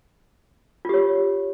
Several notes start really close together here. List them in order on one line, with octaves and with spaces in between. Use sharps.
F4 G4 C#5